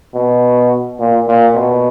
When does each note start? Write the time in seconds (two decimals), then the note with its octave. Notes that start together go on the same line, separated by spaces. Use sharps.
0.15 B2
1.00 A#2
1.27 A#2
1.55 B2